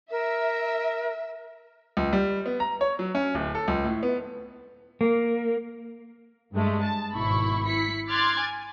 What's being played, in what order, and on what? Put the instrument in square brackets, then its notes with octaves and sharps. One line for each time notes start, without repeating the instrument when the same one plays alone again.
[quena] A#4 [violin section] E5
[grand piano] C#2
G3
B3
A#5
C#5
F#3
C#4
D1
A4
C#2
A2
B3
[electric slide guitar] A#3
[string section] G2 G#3 A3
A5
G#1 B2 E4 B5 C#6
E4 B5 B6 C#7
C6 D6 F6 F#6 G#6 A6
G#5